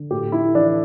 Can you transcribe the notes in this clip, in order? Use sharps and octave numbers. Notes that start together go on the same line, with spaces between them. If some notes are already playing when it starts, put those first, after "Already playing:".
Already playing: D3
A2 G4
A3 E4
E3 D4